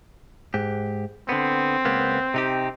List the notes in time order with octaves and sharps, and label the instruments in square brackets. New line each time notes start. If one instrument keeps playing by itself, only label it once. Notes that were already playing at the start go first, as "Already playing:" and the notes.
[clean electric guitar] G#2 G4
[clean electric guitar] D3 B3 [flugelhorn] C4
[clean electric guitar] C#2 A#3 B3
C3 D#4 G4